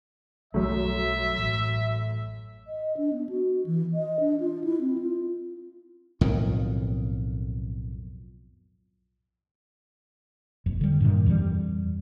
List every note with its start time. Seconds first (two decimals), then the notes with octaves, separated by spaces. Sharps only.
0.54 B1 F#2 G3 A3 E5
1.38 A1 A2
2.67 D#5
2.97 D4
3.13 B3
3.29 F#4
3.66 E3
3.94 D#5
4.20 D4
4.40 F4
4.64 E4
4.81 C4
4.98 F4
6.21 B1 F2 A2 D#3
10.66 F#1 F2
10.81 D3 G3
11.01 G2 A#2 D#3
11.26 F2 E3 F3 G3